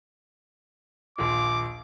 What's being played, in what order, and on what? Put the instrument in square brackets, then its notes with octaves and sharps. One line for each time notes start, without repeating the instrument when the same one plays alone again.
[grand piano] A#1 D#2 A#2 [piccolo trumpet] D6